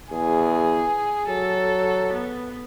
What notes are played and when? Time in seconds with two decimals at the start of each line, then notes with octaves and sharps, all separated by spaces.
0.11 E2 G#4
1.28 F#3 A4
2.13 B3